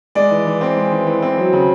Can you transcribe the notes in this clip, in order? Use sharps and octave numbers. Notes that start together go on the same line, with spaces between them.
G#3 D5
E3
E3
C4
G#3
E3
E3
C4
F#3
C#3